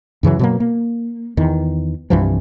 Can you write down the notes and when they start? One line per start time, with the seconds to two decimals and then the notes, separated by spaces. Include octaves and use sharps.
0.23 F#2 C#3 E3 F#3
0.39 B2 F#3 A#3
0.60 A#3
1.37 E2 D#3
2.10 C2 G2 E3 F3